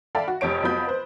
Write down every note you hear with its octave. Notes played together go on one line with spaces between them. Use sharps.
A4 D5 E5 F5 G5 B5
F#4
F1 F2 G4 C#5 D7
F2 F#3 B3 F4 B5 G6
B4 C5